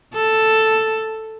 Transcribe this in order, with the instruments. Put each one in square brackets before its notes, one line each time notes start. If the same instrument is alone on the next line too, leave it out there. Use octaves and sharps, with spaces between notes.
[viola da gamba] A4